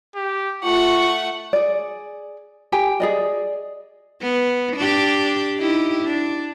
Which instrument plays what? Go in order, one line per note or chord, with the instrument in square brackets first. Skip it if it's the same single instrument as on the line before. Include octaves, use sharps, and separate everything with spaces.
[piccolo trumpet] G4
[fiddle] A3 F#5 [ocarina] F4 [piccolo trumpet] C#6
[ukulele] G#4 D5
G4 G5 G#5
G#4 D5 D#5
[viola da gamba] B3
D4 G4
D#4 E4 G4
D4